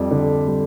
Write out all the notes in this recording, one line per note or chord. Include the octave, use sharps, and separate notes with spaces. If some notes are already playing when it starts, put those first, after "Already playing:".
Already playing: F2 G3
D3
G3